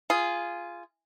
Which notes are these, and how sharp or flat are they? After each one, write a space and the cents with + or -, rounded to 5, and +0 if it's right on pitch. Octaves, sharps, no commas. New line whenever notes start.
F4 -10 G#4 +0